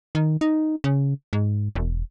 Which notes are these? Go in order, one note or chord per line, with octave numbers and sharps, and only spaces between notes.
D#3
D#4
C#3
G#2
E1